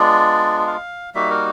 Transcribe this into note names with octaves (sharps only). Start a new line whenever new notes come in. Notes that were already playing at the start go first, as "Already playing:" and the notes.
Already playing: G#3 B3 D4 F4 D5
F5
G3 A#3 D#4 F#4 E5
A#4